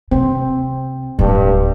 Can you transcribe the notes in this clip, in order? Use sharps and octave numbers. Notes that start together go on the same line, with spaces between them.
C3 C4
D1 G2 E4